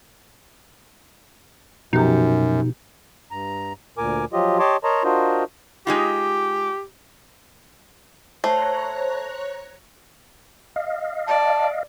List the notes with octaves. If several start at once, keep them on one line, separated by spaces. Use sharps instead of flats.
F#2 B2 F3 D#4 G4
G2 A#5
D2 A#2 A#4 G#5 D6
F3 F#3 F4 G4 D#5
G4 C#5 D#5 A5 C6 D6
A#4 C#5 D#5 A5 A#5 C6
D4 F4 F#4 A#4 C5 D#5
G#3 D#4 F4 G4
A3 C5 C#5 A#5 F#6
D#5 F5
D5 A5